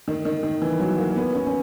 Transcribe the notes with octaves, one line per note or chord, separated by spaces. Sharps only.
D#3
D#3
D#3
E3
F#3
A#3
B3
C#4
C#4